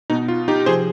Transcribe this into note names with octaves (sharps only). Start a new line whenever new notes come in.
B2 B3 D#4
F4
D#4 G4
C3 F3 C4 G#4 C5